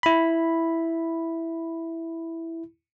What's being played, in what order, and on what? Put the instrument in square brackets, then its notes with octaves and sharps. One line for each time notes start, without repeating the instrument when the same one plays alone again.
[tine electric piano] E4 B5